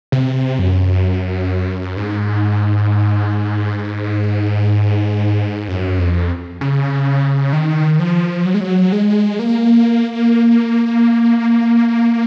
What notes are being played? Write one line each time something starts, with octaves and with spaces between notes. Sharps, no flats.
C3
F#2
G#2
F#2
F2
C#3
D#3
F3
F#3
G#3
F#3
G#3
A#3